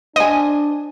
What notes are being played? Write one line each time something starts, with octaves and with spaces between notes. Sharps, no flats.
D4 C5 D#5 G#5